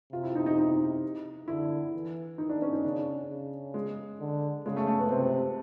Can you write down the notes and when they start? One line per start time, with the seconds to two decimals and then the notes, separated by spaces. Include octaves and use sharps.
0.12 C3 F4
0.23 E4
0.35 D#4
0.46 D#4
0.58 D#4
1.48 D3 E4
1.93 E3
2.38 D#3 D#4
2.50 D4
2.62 C#4
2.73 D#4
2.84 C#3 D4
3.29 C#3
3.74 G#3
4.20 D3
4.65 C#3 G#3
4.77 A3
4.87 A3
4.99 B3
5.10 C3 C4